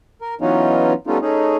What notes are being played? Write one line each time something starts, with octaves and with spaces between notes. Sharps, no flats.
A#4
E3 F#3 B3 C#4 D#4 F4
G3 A3 B3 C#4 D#4 F4
A3 C#4 D#4 G#4